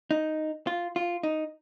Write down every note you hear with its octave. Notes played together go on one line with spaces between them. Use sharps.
D#4
F4
F4
D#4